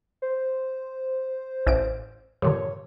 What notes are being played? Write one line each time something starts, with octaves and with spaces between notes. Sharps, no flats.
C5
A1 D7
G2 A#2 D3 C#5